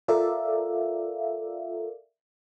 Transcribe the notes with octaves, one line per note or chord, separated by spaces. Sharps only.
F4 A4 A#4 D5 E5 F5